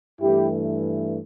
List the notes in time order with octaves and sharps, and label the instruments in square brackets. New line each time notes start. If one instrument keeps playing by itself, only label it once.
[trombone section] G2 E3 A3 E4 G4